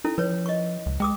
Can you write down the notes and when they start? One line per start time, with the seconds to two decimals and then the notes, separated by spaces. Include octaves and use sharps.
0.04 C#4 D#4 E4 A4
0.18 F3 B4 C#5
0.46 D#5 C#6
0.86 C#2
1.00 G#3 G5 D6 D#6